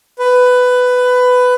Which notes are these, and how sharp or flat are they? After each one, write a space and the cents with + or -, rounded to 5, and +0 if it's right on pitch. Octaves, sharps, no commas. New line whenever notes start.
B4 +15